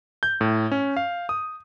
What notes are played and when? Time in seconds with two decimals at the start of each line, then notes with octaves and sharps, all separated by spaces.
0.23 G6
0.41 A2
0.72 C#4
0.97 F5
1.29 D#6